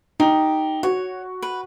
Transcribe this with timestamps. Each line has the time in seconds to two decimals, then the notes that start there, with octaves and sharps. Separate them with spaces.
0.20 D#4 G4
0.83 F#4 C#5
1.42 B4